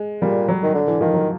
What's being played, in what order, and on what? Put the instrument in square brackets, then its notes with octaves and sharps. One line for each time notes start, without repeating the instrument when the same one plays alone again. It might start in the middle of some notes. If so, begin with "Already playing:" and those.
Already playing: [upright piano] G#3
[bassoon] A#2 [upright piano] G3
[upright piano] F#3
[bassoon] D#3
D3
[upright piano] E3
[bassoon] D#3 [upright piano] F3
[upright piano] F#3